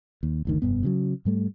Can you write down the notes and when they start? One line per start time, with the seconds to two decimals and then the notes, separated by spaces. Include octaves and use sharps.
0.23 D#2
0.45 F#1 D2 D#3
0.62 F1 G2 B3
0.83 C#3 E3 F#3
1.25 G#2 G3 A3